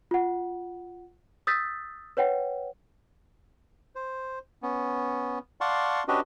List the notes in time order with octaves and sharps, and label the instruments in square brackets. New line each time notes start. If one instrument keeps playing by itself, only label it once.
[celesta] F4 F#5
D#6 E6 G6 A6 B6
B4 C#5 F#5 G5
[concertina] C5
B3 C#4
D5 F5 F#5 A5 C6 C#6
C#4 D4 F#4 G4 B4 D#5